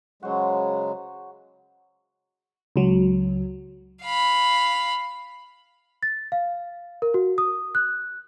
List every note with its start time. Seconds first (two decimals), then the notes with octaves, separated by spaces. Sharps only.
0.23 C#3 F#3 G#3 F#4 C5
2.76 C#2 F#3
4.02 F5 B5
6.03 A6
6.32 F5
7.02 A#4
7.14 F#4
7.38 D#6
7.75 F#6